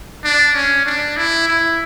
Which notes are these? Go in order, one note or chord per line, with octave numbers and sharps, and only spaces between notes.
D4
C#4
D4
E4
E4